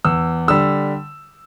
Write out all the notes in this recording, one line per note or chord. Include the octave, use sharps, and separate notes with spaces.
E2 E6
D3 G3 E6